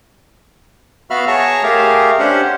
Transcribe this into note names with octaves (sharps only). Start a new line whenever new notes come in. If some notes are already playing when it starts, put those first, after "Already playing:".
B3 F#4 E5 F5 B5 F6
G#4 C#5 A5 A#5 C#6
A3 G4 G#4 A#4 F5
C#4 D4 G4 C5 F#5